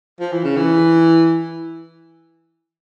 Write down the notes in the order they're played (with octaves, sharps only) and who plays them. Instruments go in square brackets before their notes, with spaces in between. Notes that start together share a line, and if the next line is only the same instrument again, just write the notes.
[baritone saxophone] F3
E3
C#3
E3